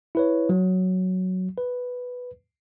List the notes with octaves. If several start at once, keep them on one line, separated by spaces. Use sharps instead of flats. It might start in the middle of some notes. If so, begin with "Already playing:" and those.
E4 B4 C#5
F#3
B4